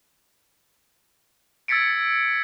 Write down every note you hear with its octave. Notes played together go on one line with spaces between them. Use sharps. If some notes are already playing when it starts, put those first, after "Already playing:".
E6 G#6 A6 B6 C#7 D7